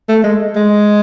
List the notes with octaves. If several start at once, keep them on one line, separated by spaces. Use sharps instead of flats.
A3
G#3
G#3